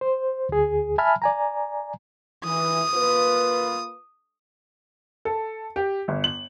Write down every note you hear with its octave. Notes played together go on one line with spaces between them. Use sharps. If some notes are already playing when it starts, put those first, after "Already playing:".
C5
D2 G#4
E5 G#5 A5 B5 F6
D5 G#5 A#5
E3 D#6
A#3 F4 B4
A4
G4
G1
F#7